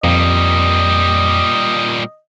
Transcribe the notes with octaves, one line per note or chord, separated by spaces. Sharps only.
F2 A#2 G3 D#5